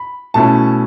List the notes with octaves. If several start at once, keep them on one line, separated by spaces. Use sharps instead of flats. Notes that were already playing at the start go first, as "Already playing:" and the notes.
Already playing: B5
B2 A3 C#4 E4 A5